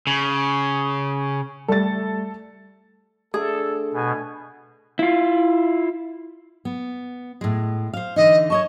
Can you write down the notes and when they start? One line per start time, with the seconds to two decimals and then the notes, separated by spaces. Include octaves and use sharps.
0.07 C#3
1.68 G3 A3 A4 A6
3.34 D3 A3 G#4 A4 D6
3.94 B2 G#5
4.99 E4 F4
6.65 B3
7.41 A2 G#3
7.93 C5 F5
8.16 D3 E3 D#4 D#5
8.50 C#5 D#5 A5 C#6